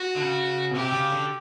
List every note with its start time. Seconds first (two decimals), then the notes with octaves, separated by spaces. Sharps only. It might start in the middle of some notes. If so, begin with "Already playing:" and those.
Already playing: F#4
0.16 D3
0.22 C#3
0.71 B2
0.75 C3 G4
0.92 C#3
1.11 D3